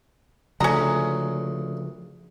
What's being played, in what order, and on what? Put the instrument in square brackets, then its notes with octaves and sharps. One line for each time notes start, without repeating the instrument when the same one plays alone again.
[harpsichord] D2 [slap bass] C#3 F3 [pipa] C#4 A#5